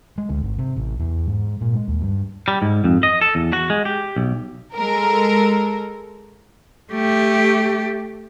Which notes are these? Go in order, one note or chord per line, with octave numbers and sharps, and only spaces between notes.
G#3
D2
G#1
C3
A1
E2
G#2
A#2
G#3
D#2
G2
G3
G#2
F2
D#5
A4
E2
F#4
G#3
G4
B1
G#3 A4 A#4
A3 G4